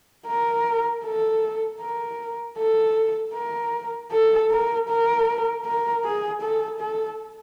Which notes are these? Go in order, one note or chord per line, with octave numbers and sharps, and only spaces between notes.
A#4
A4
A#4
A4
A#4
A4
A#4
A#4
A#4
G#4
A4
A4